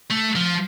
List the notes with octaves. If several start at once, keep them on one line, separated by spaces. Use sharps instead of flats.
A3
F3